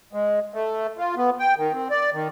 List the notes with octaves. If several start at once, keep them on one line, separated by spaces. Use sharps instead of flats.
G#3
A3
F4
B3
G5
D#3
C4
D5
D#3